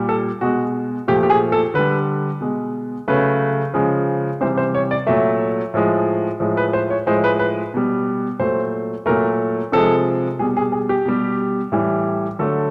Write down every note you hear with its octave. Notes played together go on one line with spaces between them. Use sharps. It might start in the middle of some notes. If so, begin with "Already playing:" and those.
Already playing: A#2 G3
A4
B2 G#3 F#4
A#2 F3 A3 G4
G4
G#4
A4
D3 G3 B4
B2 G#3
C#3 F#3 A3 B4
C#3 F3 G#3
C3 E3 G3 C5
C5
C#5
D5
A#2 F#3 A3 E5
A2 F3 G#3
A2 F3 G#3
B4
C5
C#5
A2 F3 G#3 C5
B4
B4
B2 G3
A#2 F#3 A3 C5
A#2 F#3 A3 A#4
C3 F3 G#3 A4
B2 G3 G#4
G#4
G#4
G4
B2 G3
A2 E3 G3
D3 F#3 A3 A4